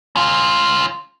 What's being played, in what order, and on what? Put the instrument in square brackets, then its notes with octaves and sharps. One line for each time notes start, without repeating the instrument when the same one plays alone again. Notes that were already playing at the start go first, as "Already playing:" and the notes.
[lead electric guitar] C#4 F4